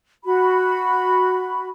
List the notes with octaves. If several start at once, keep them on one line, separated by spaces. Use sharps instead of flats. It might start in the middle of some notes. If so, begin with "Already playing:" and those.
F#4 B5